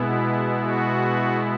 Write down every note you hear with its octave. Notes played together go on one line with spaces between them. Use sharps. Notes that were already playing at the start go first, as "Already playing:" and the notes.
Already playing: B2 G#3 B3 E4
F#4